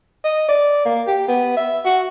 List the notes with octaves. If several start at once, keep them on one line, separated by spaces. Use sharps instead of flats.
D#5
D5
A#3
G4
B3
E5
F#4